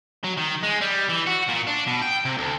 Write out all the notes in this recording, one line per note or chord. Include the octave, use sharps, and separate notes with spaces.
F#3
D#3
G#3
G3
E3
F#4
A#2
D4
B2
G5
C3
D2